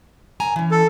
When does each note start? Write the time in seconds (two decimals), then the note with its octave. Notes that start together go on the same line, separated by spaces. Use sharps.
0.40 F#2 G#5 A#5
0.56 E3 C#4
0.71 A4